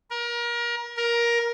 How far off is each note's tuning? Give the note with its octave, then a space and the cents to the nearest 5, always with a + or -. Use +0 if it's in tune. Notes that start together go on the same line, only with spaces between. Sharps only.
A#4 +30
A#4 +15